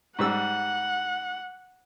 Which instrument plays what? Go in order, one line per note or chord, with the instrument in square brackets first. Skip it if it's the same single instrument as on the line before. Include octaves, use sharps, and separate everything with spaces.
[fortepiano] G#2 G3 E6 [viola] F#5